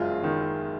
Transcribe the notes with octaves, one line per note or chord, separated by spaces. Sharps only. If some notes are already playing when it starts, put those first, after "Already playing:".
Already playing: F#1 F#2 G#3 F4 G#4
D#3